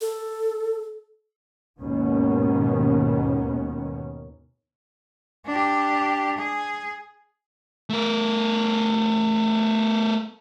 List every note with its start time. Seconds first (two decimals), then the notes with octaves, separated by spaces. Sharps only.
0.01 A4
1.80 D#2 G#2 B2 D#3 B3 C#4
5.46 D4 G4
6.37 G#4
7.90 A3 A#4